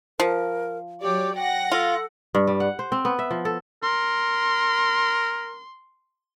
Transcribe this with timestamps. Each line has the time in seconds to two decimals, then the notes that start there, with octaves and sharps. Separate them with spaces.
0.20 F3 A#4
1.02 F#3 G4 C#5 D5
1.35 F#5 G5 A#6
1.72 F4 A4
2.35 G2
2.47 G3
2.60 F#5
2.79 C5
2.92 C4
3.05 B3
3.19 E5
3.31 F3
3.45 A4
3.83 A#4 C6